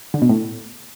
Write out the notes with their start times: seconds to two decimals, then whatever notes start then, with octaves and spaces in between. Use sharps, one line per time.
0.14 D3
0.22 B2
0.29 A2